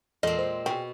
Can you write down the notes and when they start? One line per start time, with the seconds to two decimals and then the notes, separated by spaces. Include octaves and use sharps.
0.23 E2 A#2 G#3 C4 A4 D#5
0.38 C5
0.66 B2 G#4 G5